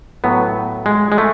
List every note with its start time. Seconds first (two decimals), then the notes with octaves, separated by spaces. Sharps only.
0.24 A2 F#3 B3
0.86 G#3
1.12 G#3
1.18 A3